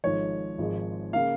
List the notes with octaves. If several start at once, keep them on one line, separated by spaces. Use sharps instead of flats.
G#1 G#2 F3 C#5
G#1 G#2 F3 G#3
C#3 A#3 F5